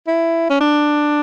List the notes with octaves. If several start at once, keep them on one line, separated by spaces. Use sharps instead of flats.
E4
C#4
D4